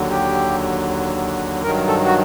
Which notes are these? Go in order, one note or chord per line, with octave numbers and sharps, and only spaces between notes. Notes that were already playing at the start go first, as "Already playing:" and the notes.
Already playing: D#2 D3 F#3
G4
G2 D#3 F#3 A#4
A4
F#4